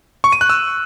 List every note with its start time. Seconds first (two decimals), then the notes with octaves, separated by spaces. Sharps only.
0.24 C#6
0.32 D#7
0.41 F#6
0.50 E6